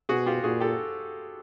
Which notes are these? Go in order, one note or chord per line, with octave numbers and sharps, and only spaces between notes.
B2 F#4 G#4
F4 G4
A#2 F#4 G#4
G4 A4